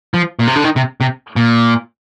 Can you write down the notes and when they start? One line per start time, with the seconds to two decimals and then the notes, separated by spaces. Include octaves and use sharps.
0.14 F3
0.39 A#2
0.47 C3
0.55 D3
0.64 D#3
0.76 C3
1.01 C3
1.36 A#2